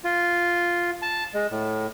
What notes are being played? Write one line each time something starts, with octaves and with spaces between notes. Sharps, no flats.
F4
A5
G#3
A2